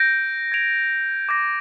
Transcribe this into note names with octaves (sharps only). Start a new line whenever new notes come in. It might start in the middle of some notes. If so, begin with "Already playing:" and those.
Already playing: G6 A#6 D7
G#6 D7 F7
D6 G6 A#6